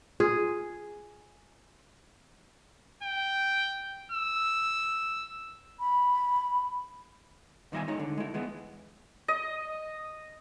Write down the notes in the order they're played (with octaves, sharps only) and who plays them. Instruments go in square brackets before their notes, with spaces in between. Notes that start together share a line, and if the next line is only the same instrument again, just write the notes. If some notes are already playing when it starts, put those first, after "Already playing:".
[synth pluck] F4 [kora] G#4
[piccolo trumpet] G5
E6
[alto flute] B5
[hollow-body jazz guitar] B1 D#3 G3 D#5 E5 G#5
G#3 D#4 C#5
D3
G#3 E4
E3 G#3 B3
[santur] D#5